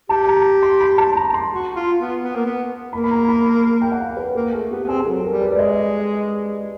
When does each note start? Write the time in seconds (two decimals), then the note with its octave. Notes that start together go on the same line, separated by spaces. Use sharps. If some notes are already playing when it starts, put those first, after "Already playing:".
0.09 G4 A5
0.27 A#5
0.63 C6
0.81 B5
0.98 A5
1.16 A#5
1.34 C6
1.52 F#4
1.75 F4
1.99 B3
2.23 B3
2.36 A#3
2.46 B3
2.93 A#3 B5
3.04 B5
3.11 A#5
3.29 B5
3.46 B5
3.81 G5
3.92 F#5
4.00 F5
4.17 B4
4.35 A#3 A#4
4.53 A3 G#4
4.71 B3 G4
4.84 B3
4.88 C4 G#4
5.00 G#4
5.06 F#3 A4
5.24 A#4
5.30 G3
5.42 B4
5.52 G#3 D5
5.59 D#5